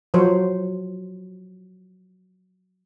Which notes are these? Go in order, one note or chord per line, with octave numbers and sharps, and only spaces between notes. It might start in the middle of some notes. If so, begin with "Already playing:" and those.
F3 F#3 C5 C#5